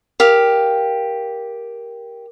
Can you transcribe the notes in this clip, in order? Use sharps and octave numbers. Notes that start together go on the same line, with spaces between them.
G4 A#4 F5